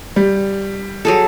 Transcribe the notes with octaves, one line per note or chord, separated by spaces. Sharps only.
G3
F#3 G#4 A4